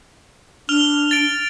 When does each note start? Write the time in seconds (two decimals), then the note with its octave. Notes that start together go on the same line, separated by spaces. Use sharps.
0.69 D4 F6 F7 G7
1.11 A6 D7